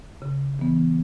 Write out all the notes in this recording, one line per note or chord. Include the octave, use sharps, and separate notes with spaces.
C#3
E3 B3